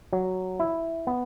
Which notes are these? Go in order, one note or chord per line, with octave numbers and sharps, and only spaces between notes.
F#3
E4
B3